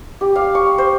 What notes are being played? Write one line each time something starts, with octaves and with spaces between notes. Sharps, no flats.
G4
F5
C#6
C5